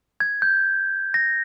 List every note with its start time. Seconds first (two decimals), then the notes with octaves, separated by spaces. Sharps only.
0.20 G#6
0.42 G6
1.14 A#6